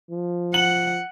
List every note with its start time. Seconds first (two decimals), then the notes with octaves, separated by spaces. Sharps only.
0.11 F3
0.54 F#5 F#7